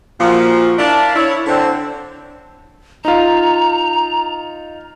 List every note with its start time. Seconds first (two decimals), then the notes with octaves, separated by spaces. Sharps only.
0.19 A#2 F3 F#4
0.77 D4 E4 A#4 D5 F5 A5
1.15 E4 C#5
1.46 D3 C4
3.05 D#4 F4 A#5